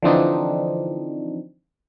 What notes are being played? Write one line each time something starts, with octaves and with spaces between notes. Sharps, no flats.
D3 E3 F3 C4 D4 D#4